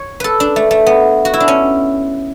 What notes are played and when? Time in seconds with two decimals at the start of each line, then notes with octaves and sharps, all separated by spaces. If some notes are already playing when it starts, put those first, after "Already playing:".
Already playing: C#5
0.20 A4 B4
0.40 D4
0.56 A3
0.71 A3
0.86 B3
1.25 F#4
1.34 E4
1.40 D4
1.48 C#4